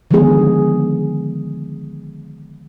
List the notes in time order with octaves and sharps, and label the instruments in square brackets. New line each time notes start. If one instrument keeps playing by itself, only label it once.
[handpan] D3 D#3 F3 G#3 B3 G#4